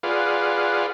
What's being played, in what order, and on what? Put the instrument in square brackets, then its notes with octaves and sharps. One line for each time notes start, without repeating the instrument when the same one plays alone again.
[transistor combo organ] F4 G#4 B4 D5 F5 F#5